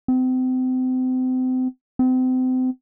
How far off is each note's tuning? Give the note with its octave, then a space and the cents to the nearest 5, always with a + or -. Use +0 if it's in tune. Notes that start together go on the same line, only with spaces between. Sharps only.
C4 -35
C4 -35